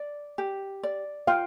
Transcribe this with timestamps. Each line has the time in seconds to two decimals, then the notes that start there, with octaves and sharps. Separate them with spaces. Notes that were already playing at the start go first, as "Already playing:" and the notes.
Already playing: D5
0.38 G4
0.83 D5
1.27 F4 F5 G5